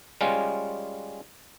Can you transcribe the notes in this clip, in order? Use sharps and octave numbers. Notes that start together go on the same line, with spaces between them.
G3 G#3 C#4 F4